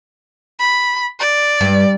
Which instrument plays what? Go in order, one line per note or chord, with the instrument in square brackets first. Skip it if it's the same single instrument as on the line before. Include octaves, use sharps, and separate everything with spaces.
[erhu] B5
D5
[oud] G2